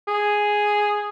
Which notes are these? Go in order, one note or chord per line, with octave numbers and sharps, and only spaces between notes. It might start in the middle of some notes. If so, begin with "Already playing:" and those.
G#4